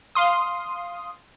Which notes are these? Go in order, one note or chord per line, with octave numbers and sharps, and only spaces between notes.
F5 C6 D#6